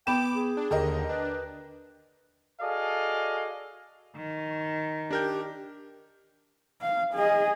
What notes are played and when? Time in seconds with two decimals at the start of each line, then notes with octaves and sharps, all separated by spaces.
0.07 B3 G5 B5 D6 E7
0.35 G#4
0.57 D4
0.71 D#2 D3 G4 A#4 D#5
1.09 D4 B4
2.61 F#4 G#4 A4 D5 D#5 F5
4.16 D#3
5.11 D4 G4 A#4 G6
6.81 F5
7.15 G#4 D#5